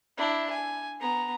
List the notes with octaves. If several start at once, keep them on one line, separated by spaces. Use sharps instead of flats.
D4 E4
G#5
B3 A#5